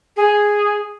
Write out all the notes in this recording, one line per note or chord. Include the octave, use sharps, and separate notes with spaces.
G#4